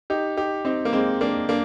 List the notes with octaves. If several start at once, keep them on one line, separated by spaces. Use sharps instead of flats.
D#4 G4
D#4 G4
C4 D#4
A#3
G#3 C4
A#3 D4
A#3 D4